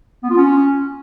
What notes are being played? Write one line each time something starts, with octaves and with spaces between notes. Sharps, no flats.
B3
F4
C#4